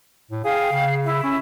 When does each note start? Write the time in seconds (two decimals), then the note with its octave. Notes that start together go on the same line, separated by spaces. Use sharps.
0.31 A2
0.44 G#4 F5 G5
0.72 C#3
1.04 E4
1.23 C#4